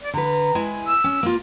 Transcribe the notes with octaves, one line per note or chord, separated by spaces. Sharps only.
D5
D3 B4 A#5
G#3 E4 G#5
E6
C#4
A#3 F4